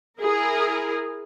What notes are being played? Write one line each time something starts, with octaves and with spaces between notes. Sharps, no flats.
E4 G#4 A#4